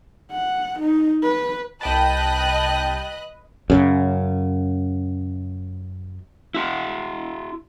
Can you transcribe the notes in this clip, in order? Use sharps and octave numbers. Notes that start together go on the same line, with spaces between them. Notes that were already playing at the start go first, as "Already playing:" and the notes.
F#5
D#4
B4
C2 B4 D#5 G5 A5 F#6
F#2 C#3
E4 F#4